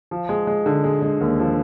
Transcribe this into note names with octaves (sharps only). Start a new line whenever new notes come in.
F3
G#3
G#3
D3
G#3
G#3
D#2
F3